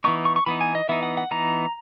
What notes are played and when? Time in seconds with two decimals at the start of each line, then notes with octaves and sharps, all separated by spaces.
0.04 E3 B3 D#4 C#6
0.25 C#6
0.36 C#6
0.46 E3 B3 D#4 B5
0.61 G#5
0.75 D#5
0.89 E3 B3 D#4 E5
1.03 F#5
1.17 F#5
1.31 E3 B3 D#4 A#5